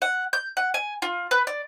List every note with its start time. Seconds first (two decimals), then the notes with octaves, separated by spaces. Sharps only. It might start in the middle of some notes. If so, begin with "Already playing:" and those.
0.02 F#5
0.33 G6
0.57 F#5
0.74 G#5
1.02 F4
1.31 B4
1.47 D5